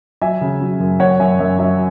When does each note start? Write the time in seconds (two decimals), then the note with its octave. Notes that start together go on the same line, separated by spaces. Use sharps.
0.21 F#3 E5 G#5
0.41 C#3
0.61 F#3
0.80 F#2
1.00 F#2 C#5 F#5
1.19 F#2 E5 G#5
1.39 F#2 E5
1.59 F#3 E5